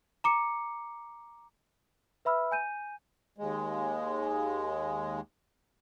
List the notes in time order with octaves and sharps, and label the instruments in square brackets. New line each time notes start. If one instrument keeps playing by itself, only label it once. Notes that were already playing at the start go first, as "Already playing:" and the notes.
[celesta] A#5 D6 C#7
B4 E5 B5 E6 F6
G#5 G6 D#7
[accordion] D#2 G#3